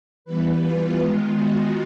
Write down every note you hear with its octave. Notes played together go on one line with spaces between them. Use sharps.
E3 G3 B3 B4
F4
D#3 G#3 B3 F4
F#4